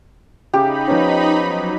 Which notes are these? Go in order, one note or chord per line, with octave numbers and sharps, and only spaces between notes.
C#3 D#4 G4 B5
F3 B3 C#4
F#3